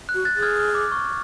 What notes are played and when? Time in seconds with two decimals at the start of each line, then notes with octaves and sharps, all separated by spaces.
0.09 F#6
0.14 F#4
0.25 F#6 A6
0.37 G#4 A6
0.42 F6 G#6
0.59 F6
0.75 D6
0.92 C#6